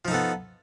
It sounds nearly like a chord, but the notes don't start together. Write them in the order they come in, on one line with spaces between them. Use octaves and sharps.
F3 D#4 A4 B3